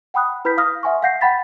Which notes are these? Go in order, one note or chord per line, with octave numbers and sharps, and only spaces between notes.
F#5 G5 B5 D#6 F#6
E4 B4 B5 G6 B6
F5 D#6 F6 A#6
E5 F#5 G#5 C6 C#6
F5 F#5 G6 A#6 C7
F#5 G5 B5 A6 B6